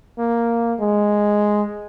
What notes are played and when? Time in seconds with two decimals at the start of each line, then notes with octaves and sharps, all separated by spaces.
0.19 A#3
0.80 G#3